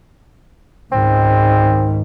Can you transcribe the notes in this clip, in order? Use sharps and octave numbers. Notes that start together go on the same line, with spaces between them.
C#2 G#2 D#3 C4